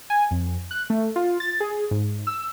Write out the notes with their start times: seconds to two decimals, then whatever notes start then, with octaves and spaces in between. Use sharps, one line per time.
0.10 G#5
0.31 F2
0.71 F#6
0.90 A3
1.16 F4
1.40 A6
1.60 G#4
1.91 G#2
2.27 E6